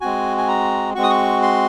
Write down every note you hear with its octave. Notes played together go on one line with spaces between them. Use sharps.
G#3 C4 F#4 G#5
G#5
A#5
G#3 C4 F#4 C#6
D#6
C#6
C6